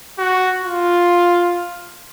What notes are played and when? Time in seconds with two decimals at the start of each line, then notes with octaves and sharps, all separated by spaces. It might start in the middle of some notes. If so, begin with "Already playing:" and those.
0.18 F#4
0.64 F4